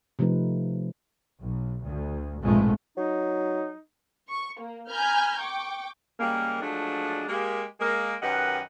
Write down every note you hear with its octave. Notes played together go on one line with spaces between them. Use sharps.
C3 F3 A3 D#4 B4
B1
D2
A#1 F2 G#2 B2 G#3 A3
F#3 D#4
C#6
A#3
G#5 A#5 B5 F6 G6 G#6
G5 C#6 D6
C#3 G3 G#3 A#3
F3 F#3 G#3 A3 D4
G#3 A#3 G4
G#3 A#3 A#4
F#2 D#3 G4 B4 D#5 F#5